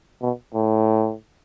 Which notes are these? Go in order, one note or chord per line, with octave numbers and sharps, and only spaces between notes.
B2
A2